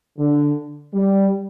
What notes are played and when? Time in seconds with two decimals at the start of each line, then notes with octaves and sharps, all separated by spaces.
0.18 D3
0.93 G3